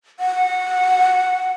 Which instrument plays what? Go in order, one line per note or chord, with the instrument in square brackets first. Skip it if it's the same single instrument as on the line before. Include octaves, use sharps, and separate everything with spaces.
[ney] F#5